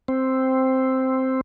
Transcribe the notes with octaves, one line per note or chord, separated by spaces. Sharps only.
C4